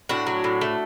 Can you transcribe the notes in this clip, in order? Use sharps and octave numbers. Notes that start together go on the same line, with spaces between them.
A2 D4 F#4
F#3
A2
A3